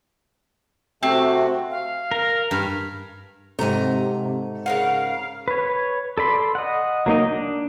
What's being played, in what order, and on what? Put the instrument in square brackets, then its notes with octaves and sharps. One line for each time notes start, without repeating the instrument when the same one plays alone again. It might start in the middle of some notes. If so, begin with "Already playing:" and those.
[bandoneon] C3 A3 [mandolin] C4 [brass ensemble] F#4
[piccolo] F5
[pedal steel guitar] A#4
[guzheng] G2 [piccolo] F6
[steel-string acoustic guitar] G#2 A#5 [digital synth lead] C3 [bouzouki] A3 G#5
[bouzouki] C#3 A#4 F#5 [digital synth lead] F5
[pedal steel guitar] B4 C#5
A4 D5 B5 C6
D#5 F#5
F#3 A#3 D#4 D#5
D4